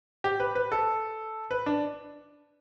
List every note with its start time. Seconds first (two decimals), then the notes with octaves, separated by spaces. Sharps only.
0.24 G4
0.40 B4
0.55 B4
0.72 A4
1.51 B4
1.66 D4